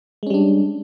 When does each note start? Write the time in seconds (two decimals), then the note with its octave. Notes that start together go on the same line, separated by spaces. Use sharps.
0.23 G#3
0.27 C#4
0.30 G3
0.34 D4